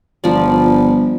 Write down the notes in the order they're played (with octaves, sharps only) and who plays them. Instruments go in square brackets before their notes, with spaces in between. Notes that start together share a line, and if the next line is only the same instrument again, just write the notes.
[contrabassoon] G1 [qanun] F3 D5